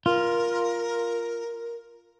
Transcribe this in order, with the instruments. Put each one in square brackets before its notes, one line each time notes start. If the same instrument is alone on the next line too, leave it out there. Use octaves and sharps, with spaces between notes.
[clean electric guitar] F4 [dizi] A#4